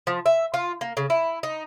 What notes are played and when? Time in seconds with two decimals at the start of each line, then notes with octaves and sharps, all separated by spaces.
0.07 F3
0.26 E5
0.54 F4
0.81 A#3
0.97 C#3
1.10 E4
1.43 D#4